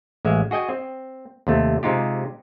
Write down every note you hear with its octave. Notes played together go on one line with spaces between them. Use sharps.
A1 G#3 E5 F5
F#4 G#4 D#5 G5 G#5
C4
D#2 C3 A3
C3 G#3 D#4 F4 G4